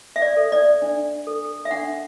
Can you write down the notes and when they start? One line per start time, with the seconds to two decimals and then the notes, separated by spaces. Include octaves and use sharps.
0.16 E5
0.22 D5
0.37 A4
0.52 D5
0.82 D4
1.27 A4
1.65 E5
1.71 D4 F#5